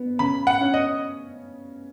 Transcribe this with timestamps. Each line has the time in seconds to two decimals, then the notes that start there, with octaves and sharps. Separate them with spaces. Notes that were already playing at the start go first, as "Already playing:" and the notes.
Already playing: B3
0.19 C#3 B5
0.47 F#5
0.61 C#4
0.74 D#5